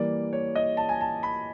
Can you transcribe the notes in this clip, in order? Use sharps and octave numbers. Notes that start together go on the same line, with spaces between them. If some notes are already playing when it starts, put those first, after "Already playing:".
Already playing: E3 G3 A#3 D5
C#5
D#5
A5
G#5
A5
B5